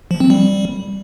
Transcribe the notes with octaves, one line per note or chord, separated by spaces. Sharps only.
F3
C4
G3